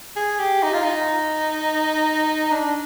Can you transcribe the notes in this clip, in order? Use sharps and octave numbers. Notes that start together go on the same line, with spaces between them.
G#4
G4
D#4
F4
D#4
D4